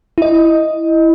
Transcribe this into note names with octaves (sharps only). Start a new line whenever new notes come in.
E4 D#5